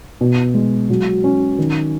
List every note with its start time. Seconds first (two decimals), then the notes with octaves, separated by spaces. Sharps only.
0.21 B2
0.54 G#3
0.90 F#3
1.24 C#4
1.59 D#3